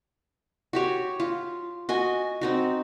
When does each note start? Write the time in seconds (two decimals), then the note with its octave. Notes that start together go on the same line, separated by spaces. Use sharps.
0.73 F#4 G4 C#5
1.20 F4
1.89 F#4 D#5 G#5
2.41 C4 D#4 F#4